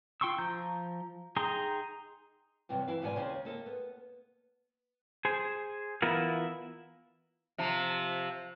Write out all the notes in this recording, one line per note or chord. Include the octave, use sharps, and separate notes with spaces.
F4 G5 C6 C#6 E6
F3 A#5 G6
D#4 G#4 G5 A#5 C6
E2 G2 C3 F#3
E3 E4 F5
G#2 B2 F3 F#4 D5 G#5
D#2 C#3 C5
A#3 A4 D#5
B3
G#4 C5
E3 B3 E4 F4 A#4
C3 F3